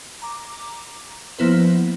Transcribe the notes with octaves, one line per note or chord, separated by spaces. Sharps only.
A#5 D6
F3 A#3 B3 E4 B4 C5